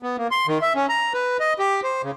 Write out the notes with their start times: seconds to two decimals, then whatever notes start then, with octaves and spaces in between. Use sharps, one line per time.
0.03 B3
0.18 A#3
0.31 C6
0.47 D#3
0.62 E5
0.75 C#4
0.89 A#5
1.14 B4
1.40 D#5
1.59 G4
1.84 C5
2.03 C#3